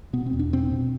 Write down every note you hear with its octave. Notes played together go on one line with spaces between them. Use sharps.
B2 B3
C4
E2
D4
B2 C4
B2